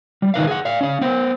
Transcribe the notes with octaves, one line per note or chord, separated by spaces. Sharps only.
G3
D#3 D#4 B4 F5
G#4 F#5
D5 F5
C#4 F5
B3 C5